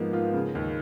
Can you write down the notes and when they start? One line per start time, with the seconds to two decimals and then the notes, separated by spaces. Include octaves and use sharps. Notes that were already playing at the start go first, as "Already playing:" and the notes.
Already playing: G#2 F3 A#3 B3
0.13 F4
0.34 C#3
0.55 D#2